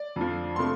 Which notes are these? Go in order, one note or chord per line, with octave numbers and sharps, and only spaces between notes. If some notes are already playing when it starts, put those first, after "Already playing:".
Already playing: D5
F2 D3 F3
C3 F3 A3 C6